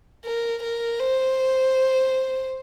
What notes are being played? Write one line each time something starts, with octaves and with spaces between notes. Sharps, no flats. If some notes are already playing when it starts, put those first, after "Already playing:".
A#4
A#4
C5